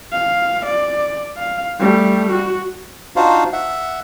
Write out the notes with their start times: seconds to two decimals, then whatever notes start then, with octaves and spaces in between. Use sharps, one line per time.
0.12 F5
0.66 D5
1.37 F5
1.80 G3 A3
2.31 F#4
3.16 D4 D#4 F4 F#4 C5 F5
3.53 E5 F#5